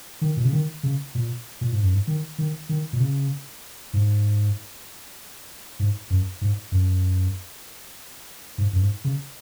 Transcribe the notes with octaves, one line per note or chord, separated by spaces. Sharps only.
D#3
A#2
C#3
D#3
C#3
A#2
A#2
G#2
F#2
G#2
D#3
D#3
D#3
A#2
C#3
G#2
G#2
F#2
G#2
F#2
G#2
F#2
G#2
C#3